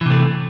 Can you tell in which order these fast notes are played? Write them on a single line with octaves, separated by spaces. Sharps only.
E3 C3 A3